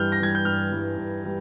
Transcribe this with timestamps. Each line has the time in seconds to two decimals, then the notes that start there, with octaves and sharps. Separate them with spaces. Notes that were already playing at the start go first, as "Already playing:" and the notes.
Already playing: G2 E3 G3 F6 G6
0.12 A#6
0.20 E3 G3 G#6
0.35 G6
0.45 G2 F6
0.72 E3 G3
0.97 G2
1.24 E3 G3